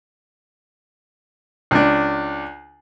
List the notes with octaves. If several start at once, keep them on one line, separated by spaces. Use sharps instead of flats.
C#2 D4